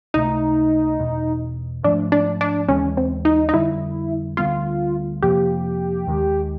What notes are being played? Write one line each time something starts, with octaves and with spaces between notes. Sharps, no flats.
C#2 C3 E3 A3 D#4
E1 E2 B2
G#2 F3 A3 D4
D4
D4
D#2 C#3 E3 G#3 C#4
C4
D#4
D#4
F2 D3 G3 E4
D2 D3 G3 B3 F4
F2 C3 F3 A#3 G4
D#2 D#3 G#3